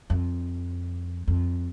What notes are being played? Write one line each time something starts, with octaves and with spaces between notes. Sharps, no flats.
F2
F2